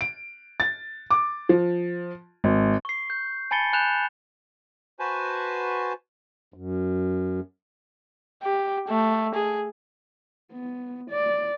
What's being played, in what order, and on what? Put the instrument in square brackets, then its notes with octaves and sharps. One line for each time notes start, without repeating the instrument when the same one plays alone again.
[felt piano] D7
A6
D6
F3
G#1
[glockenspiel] C#6 C7
G6
G#5 A5 B5 A6 C#7 G7
G#5 B5 F#6 G6 E7 F7
[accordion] F#4 B4 C5 G#5 A5
[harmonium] F#2
[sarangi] G4
A3
G#4
[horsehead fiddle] B3
D5